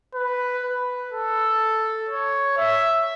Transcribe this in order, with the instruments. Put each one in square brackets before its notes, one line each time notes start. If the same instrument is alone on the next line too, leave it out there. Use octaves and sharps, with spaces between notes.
[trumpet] B4
B4
A4
C#5
E5